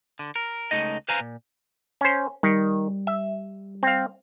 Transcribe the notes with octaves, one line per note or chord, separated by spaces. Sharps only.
D3
A#4
C#2 C3 A3 D#4 D#5
B4 C5 F5 G#5 A#5
A#2
C#4 C5
D#3 G3
E5
C4 F5